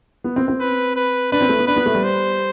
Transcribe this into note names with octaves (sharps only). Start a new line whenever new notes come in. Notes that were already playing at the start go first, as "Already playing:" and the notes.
B3
C4
C4
B4
B4
D4 B4
C4
A3
B3
D4 B4
B3
A3
G3
C5